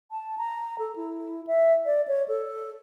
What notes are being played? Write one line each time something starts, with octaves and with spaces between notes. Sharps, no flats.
A5
A#5
A4
E4
E5
D5
C#5
A4